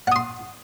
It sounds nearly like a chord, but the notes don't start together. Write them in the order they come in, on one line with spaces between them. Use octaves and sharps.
F#5 D#6 C6